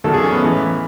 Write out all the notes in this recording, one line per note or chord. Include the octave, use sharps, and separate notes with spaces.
E2 D#3 F#3 A4
G#4
C#4
B3
A1 A2 E3